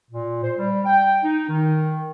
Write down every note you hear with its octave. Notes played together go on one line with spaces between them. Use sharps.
A#2
C5
G3
G5
D#4
D#3